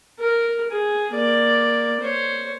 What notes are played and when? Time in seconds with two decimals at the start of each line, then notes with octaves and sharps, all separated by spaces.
0.19 A#4
0.71 G#4
1.11 A#3 D5
2.01 C5 C#5